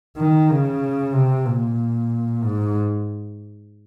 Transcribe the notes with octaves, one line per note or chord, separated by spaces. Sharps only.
D#3
C#3
C3
A#2
G#2